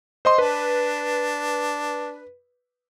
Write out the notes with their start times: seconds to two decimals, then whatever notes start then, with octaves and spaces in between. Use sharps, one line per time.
0.25 C5 D#5 C6
0.38 D4 B4